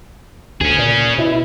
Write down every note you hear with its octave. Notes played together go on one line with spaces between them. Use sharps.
D2 C#4 G#4
A#2
B2 E4